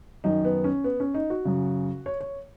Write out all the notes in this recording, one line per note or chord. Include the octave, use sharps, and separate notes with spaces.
F#2 D#3 D#4
B3
C#4
B3
C#4
D#4
F#4
F#2 C#3
C#5
C#5